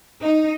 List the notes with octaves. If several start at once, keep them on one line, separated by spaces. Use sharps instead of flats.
D#4